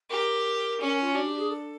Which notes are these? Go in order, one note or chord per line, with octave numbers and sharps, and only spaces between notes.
G4 A#4
C#4
F4
D4 F#4
G4
G#4
A4